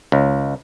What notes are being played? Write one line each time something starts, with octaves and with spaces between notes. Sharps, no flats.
C#2